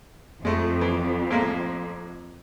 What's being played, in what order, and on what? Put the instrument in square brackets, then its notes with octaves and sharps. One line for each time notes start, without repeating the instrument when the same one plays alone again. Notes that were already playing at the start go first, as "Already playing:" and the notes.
[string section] F2 [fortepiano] G#3 A3
[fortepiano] E3
A2 G#3 A#3